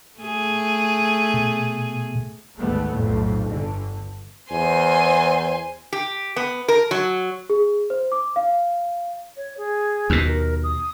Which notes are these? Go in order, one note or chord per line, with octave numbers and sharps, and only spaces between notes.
A3 G#4
B2
G#1 D2 G3 A3 B3
B1 F2 A2
G1 D3
E2 C5 G#5
G4
B3
A#4
F#3
G#4
C5
D6
F5
C#5
G#4
D#2 B2
A#4
D#6